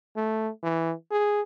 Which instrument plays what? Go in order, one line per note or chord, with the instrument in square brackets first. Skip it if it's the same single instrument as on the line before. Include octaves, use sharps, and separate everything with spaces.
[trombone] A3
E3
G#4